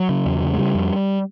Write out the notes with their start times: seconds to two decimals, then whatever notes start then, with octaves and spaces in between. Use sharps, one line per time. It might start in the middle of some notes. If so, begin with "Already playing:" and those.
Already playing: F#3
0.09 C#3
0.26 E2
0.42 C#3
0.53 G#3
0.58 C#3 G3
0.75 F2